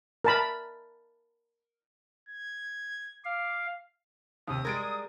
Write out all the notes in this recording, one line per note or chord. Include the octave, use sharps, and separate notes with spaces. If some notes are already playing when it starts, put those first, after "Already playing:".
A#4 A5 B5
G#6
F5 D6
D#2 C3 D#6
G3 G#3 A#4 G#6 A6 D7